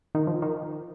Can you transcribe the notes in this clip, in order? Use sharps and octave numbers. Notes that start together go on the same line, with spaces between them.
D#3
F3
D#3